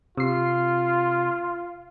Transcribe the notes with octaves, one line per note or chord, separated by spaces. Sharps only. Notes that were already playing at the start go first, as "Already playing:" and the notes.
C3 F4 C7